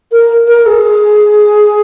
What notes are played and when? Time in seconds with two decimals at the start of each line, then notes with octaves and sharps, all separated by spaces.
0.12 A#4
0.47 A#4
0.66 G#4